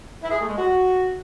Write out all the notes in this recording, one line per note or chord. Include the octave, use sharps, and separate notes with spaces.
E4
G#4
A3
G#3
F#4